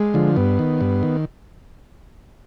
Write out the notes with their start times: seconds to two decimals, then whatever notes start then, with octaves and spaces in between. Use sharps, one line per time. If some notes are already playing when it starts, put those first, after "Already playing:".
Already playing: G#3
0.14 D3 F3
0.36 G2 B3
0.59 D#3
0.81 G2
1.03 D#3